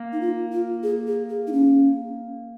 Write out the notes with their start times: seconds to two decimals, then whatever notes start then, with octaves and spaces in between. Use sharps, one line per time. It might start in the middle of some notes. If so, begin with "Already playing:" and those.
Already playing: A#3
0.13 D#4
0.21 F4
0.52 F4
0.83 G#4
1.07 G#4
1.30 G#4
1.47 D#4
1.52 C#4